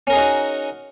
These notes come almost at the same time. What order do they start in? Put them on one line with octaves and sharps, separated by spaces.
C#4 A#4 G#4 D#4 F#4